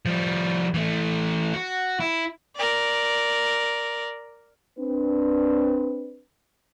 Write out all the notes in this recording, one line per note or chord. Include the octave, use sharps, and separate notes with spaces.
F3 G3
E3 A3
F#4
E4
A#4 D5
C4 D4 B4